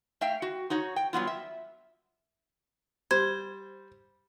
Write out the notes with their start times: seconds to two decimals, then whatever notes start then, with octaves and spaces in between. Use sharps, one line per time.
0.21 A3 E5 F5 G5
0.42 F#4
0.70 D#4 F#4 C#5
0.96 G5
1.13 F#3 G3 B3 F4
1.27 E5
3.11 G3 C5 G#6